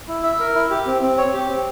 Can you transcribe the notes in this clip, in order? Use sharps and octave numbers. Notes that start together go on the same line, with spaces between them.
E4
E5
A#4
E4
G4
C4
C4
C#5
G4
C4